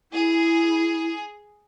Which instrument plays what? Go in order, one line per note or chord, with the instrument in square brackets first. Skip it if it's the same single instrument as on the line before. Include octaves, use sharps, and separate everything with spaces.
[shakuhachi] E4 [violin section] G#4